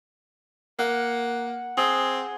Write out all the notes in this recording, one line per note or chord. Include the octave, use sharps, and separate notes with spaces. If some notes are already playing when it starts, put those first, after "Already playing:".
A#3 F#5
C4 G#4